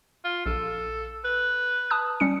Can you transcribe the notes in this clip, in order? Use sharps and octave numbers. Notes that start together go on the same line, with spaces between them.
F4
A#1 A4
B4
A5 D#6 F#6
G3 C#4 C#7